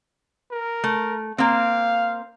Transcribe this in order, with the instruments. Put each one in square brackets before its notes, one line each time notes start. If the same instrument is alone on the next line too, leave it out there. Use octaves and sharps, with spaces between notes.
[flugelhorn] A#4
[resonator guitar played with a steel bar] A3
[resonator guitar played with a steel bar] A#3 C4 [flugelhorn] F5